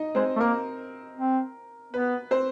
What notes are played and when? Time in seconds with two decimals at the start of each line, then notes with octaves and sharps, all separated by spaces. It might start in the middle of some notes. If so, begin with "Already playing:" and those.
Already playing: D#4 D#5
0.15 G#3 C4 C5
0.36 A3
0.41 A#3 A#4
1.17 C4
1.93 B3 B4
2.31 C4 C5